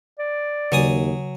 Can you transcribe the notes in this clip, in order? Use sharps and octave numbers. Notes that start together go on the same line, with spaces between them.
D5
D#2 C#3 F#3 G#5 D#6